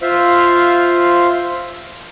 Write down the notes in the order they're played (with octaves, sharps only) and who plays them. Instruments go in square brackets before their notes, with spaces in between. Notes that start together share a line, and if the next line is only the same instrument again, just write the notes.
[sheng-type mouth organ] F4 C5 E5 F5